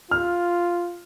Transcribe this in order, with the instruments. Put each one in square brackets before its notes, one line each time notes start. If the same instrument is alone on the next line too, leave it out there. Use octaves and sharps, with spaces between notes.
[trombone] F4 [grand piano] F6